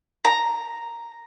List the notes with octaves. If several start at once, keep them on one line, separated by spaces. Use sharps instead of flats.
A#5